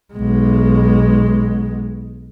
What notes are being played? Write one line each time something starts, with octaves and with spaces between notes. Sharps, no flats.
B1 G#3